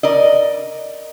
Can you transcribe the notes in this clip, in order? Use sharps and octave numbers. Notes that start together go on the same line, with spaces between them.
A#4 D5 D#5